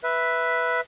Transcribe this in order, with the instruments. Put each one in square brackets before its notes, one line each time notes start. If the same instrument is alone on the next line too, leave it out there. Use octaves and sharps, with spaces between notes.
[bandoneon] B4 E5